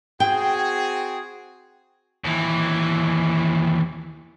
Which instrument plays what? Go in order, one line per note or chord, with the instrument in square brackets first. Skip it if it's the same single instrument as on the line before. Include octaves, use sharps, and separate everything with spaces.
[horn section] C4 F#4 G#4 [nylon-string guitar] G5
[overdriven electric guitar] D#2 E3